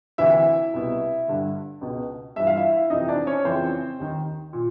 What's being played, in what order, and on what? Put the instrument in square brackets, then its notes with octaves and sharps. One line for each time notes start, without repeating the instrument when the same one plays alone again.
[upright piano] D2 C3 E3 E4 E5
C2 B2
G2 D3
C#2 B2
G2 E3 E5
F5
E4 E5
F2 C3 E3 D#4 D#5
D4 D5
C#4 C#5
F2 C#3 E3 C4 C5
D#2 D#3
A#2